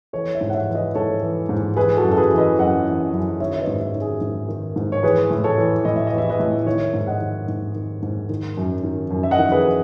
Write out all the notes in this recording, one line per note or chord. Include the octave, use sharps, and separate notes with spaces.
E3 A4 C#5
C#5 E5
G#2
F#5
C#5 E5
E3
B4 D#5
G#2 A4 C#5
E3
G#2
E3 G#4 B4
F#4 A4
F#2
A4
G#4 B4
E3
B4 D#5
F#2 D#5 F#5
E3
F#2
D#3 C#5 E5
E5
B4 D#5
G#2
C#5 E5
D#3
G#4
G#2
D#3
G#2
C#5
E3 G#4 B4
A2
A4 C#5
E3
A2 D#5
E5
E3 D#5
E5
B4 D#5
A2
D#3 C#5 E5
G#2
D#5 F#5
D#3
G#2
D#3
G#2
D#3
F#2
D#3
F#2
E5
D#5 F#5
D#3
G#4 B4